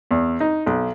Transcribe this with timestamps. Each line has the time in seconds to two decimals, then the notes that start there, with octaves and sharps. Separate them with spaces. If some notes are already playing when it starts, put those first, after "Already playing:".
0.11 E2
0.40 D#4
0.66 B1